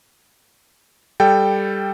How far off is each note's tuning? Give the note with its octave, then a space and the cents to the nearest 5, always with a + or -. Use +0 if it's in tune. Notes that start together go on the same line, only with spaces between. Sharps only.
G3 +10 A4 +5 G5 +0